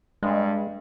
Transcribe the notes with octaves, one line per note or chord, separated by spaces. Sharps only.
G2 G#3